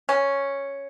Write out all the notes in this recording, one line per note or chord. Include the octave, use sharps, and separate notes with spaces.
C#4